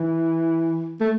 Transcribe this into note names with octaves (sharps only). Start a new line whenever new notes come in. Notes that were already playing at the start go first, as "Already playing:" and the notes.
Already playing: E3
A3